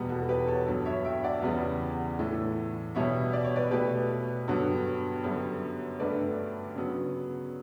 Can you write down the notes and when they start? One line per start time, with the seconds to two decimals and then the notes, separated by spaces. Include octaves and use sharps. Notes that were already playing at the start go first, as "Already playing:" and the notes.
Already playing: E2 B2 G3 B3
0.09 F#4 A4
0.28 G4 B4
0.48 A4 C#5
0.67 G2 F#3 B3
0.85 C#5 E5
1.04 E5 G5
1.23 D5 F#5
1.42 E2 C#3 G3 B3
2.19 A2 E3 A3
2.95 B2 G3 B3 C#5 E5
3.33 D5
3.45 C#5
3.56 B4 D5
3.71 B2 A3 G4 B4
4.48 G2 D3 F#3 B3
5.24 F#2 D3 G3 B3
6.00 G2 D3 A3 B4 D5
6.75 C#3 F#3 B3